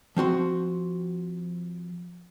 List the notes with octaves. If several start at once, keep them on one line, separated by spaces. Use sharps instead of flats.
F3 C4 F#4 C6